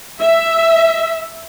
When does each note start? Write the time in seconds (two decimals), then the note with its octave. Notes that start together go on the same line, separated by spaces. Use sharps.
0.20 E5